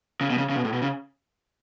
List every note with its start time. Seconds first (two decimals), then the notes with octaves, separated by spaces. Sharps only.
0.21 C#3
0.30 B2
0.38 C#3
0.50 C#3
0.56 B2
0.65 A2
0.73 B2
0.82 C#3